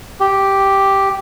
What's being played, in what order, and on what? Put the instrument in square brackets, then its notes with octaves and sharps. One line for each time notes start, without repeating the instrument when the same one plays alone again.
[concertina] G4